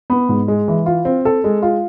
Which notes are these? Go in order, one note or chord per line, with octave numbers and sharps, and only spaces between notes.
B3
G#2
G#3
E3
F4
C4
A4
G#3
F4